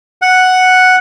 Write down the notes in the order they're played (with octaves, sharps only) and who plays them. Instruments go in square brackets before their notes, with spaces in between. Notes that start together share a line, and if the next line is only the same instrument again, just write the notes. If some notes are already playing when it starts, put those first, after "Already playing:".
[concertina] F#5